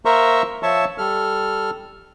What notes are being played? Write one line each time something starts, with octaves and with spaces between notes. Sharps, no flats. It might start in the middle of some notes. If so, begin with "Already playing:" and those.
A#3 A#4 C5 E5 A#5 C#6
F3 C#5 E5 A5 C#6 E6
G3 A4 F6